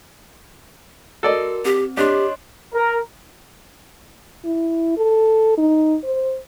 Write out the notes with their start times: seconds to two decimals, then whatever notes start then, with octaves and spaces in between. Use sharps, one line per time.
1.23 F#4 A4 A#4 D5 D#5
1.65 C4 G4
1.97 D4 G4 C#5 D#5 C6
2.74 A#4
4.45 E4
4.98 A4
5.57 D#4
6.04 C5